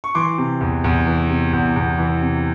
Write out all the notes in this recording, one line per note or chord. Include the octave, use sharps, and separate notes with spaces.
C#6
E3 C6 D6
C3
E2
E2
E3
C3
E2
E2
E3
C3